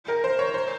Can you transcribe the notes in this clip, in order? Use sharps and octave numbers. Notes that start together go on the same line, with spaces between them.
A#4
C5
C#5
C5